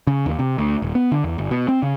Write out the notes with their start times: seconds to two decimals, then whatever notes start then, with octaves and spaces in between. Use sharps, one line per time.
0.07 C#3
0.26 D#2
0.39 C3
0.58 D2
0.82 D#1
0.95 B3
1.12 D3
1.24 E2
1.38 G1
1.51 B2
1.68 C4
1.82 C#3